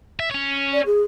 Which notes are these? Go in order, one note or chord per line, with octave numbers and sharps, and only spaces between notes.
E5
C#4 C#5
D5
G#4